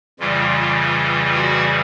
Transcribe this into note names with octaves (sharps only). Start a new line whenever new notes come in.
F2 C#3 E3 G3 F4
F4
F#4